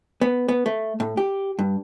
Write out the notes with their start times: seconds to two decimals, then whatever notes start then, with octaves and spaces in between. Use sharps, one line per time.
0.21 B3
0.48 B3
0.66 A3
1.00 A2
1.17 G4
1.59 G2